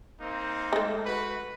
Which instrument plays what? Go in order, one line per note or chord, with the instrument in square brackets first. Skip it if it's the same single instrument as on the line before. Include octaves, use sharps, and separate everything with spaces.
[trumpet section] A#3 C4 D#4
[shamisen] G#3 A3
[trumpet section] F#4 B4